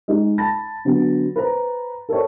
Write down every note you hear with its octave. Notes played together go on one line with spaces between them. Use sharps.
G#3 D#4
A5 B5 A6 A#6
D3 F#3 B3
B4 C5 A#5
A4 A#4 C5 C#5